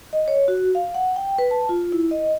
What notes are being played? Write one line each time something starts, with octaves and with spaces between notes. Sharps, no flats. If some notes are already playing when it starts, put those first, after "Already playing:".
D#5
C#5
F#4
F5
F#5
G5
B4
A5
F4
E4
D#5